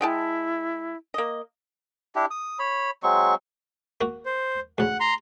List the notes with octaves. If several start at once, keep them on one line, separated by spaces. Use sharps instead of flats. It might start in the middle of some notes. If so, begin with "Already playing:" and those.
G#3 E4 G5 A5
A#3 D#5
D4 E4 G4
D#6
C#5 B5
F#3 G#3 C4 C#6
A#3 F#4
C5
D2 C#3 F#5
A#5 C6